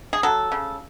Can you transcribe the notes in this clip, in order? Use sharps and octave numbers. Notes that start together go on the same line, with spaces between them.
G#4
F#3 A4
C#3